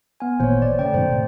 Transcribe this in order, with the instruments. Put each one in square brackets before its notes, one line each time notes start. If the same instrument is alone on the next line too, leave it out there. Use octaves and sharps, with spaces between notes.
[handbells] B3 G#5
[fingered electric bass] G#1 A#2 E3 [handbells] C5 C#5
[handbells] D5
[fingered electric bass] C#3 [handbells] A3 D5 G5
[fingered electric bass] G2 B2 D#3 [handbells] C5
[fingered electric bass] A2 C3